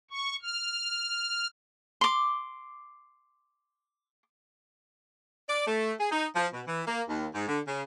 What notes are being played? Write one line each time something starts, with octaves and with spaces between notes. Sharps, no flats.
C#6
F6
C6 D6
D5
A3
G#4
D#4
F3
B2
E3
A#3
D#2
G#2
D3
C#3